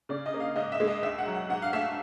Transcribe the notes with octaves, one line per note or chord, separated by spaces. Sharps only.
C#3 D5
D#5
A#3
F5
G#2 D#5
E5
G#3
D#5
D#2 E5
F#5
F#3
F#5
G#2 F#5
F5
A3 E5